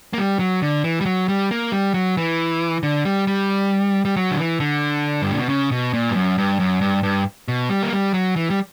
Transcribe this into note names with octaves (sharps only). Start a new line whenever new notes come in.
A#3
G3
F#3
D3
E3
G3
F#3
G3
A#3
G3
F#3
E3
D3
G3
G3
G3
F#3
D3
E3
D3
G2
A#2
B2
C#3
B2
A#2
G2
F#2
G2
F#2
G2
G2
B2
G3
A#3
G3
F#3
E3
G3